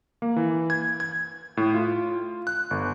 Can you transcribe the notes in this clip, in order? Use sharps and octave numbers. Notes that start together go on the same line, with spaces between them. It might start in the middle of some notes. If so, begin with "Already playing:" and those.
A#3
E3
G#6
G#6
A2
F4
F#6
G1